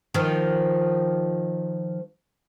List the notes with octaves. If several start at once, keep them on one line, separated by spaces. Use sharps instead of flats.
D#3 F3